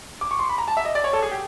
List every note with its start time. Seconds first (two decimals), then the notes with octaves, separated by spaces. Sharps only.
0.21 D6
0.31 C#6
0.39 C6
0.49 B5
0.58 A#5
0.68 A5
0.77 E5
0.85 D#5
0.95 D5
1.04 C#5
1.13 A4
1.23 G#4
1.32 G4